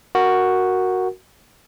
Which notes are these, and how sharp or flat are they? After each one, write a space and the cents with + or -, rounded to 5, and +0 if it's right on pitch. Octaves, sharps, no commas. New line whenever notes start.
F#4 +0 A#4 +0